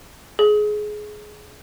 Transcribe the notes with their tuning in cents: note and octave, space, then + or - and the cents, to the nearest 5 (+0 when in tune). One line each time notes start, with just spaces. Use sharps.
G#4 +20